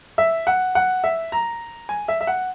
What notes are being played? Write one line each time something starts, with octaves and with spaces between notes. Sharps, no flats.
E5
F#5
F#5
E5
A#5
G#5
E5
E5
F#5